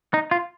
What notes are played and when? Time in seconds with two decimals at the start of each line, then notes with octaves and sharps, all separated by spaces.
0.14 D#4
0.31 F4